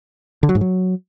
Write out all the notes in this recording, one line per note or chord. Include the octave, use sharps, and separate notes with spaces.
D3
F#3
G#2
F#3